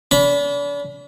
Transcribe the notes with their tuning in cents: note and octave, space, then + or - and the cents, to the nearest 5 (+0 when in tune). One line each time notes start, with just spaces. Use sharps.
D4 -40 B5 +0